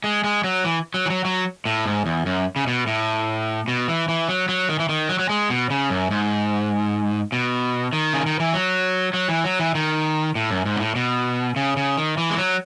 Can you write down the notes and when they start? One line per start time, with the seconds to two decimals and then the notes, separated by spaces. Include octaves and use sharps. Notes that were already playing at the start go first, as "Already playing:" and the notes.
0.04 G#3
0.24 G#3
0.44 F#3
0.64 E3
0.94 F#3
1.06 E3
1.10 F#3
1.25 F#3
1.65 A2
1.86 G#2
2.06 E2
2.26 F#2
2.56 C#3
2.67 B2
2.87 A2
3.68 B2
3.88 E3
4.08 E3
4.29 F#3
4.49 F#3
4.69 D#3
4.79 E3
4.89 D#3
5.09 F#3
5.19 F#3
5.30 G#3
5.50 B2
5.70 C#3
5.90 F#2
6.11 G#2
7.32 B2
7.93 D#3
8.13 C#3
8.26 D#3
8.40 E3
8.53 F#3
9.14 F#3
9.28 E3
9.44 F#3
9.59 E3
9.75 D#3
10.35 A2
10.51 F#2
10.66 G#2
10.76 B2
10.80 A2
10.96 B2
11.56 C#3
11.77 C#3
11.97 D#3
12.18 E3
12.30 G#3
12.38 F#3